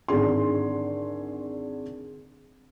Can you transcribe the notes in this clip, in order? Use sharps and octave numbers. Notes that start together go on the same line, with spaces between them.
G#1 D3 G#4 C6